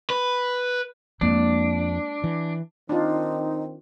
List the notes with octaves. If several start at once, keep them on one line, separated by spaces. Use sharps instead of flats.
B4
F2 G#3 A#3 D4
E3
D#3 C4 D4 D#4 F4